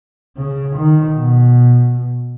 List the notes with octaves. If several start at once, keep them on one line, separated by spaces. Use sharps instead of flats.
C#3
D#3
B2